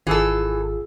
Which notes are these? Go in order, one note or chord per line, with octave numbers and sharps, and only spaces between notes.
G#1 E3 F4 G#4 A4 E6